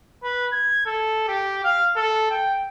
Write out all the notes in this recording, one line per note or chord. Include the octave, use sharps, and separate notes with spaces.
B4
G#6
A4
G4
F5
A4
G5